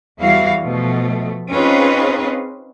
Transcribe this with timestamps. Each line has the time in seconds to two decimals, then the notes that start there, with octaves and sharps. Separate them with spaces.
0.20 E2 E3 G3 E4 F#4 F5
0.63 B2 F3 A3
1.51 C4 C#4 D#4 F4 G#4 B4